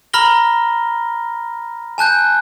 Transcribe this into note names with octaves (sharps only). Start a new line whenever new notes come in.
A#5 B5 F6 A#6 G7
G#5 A5 F#6 G6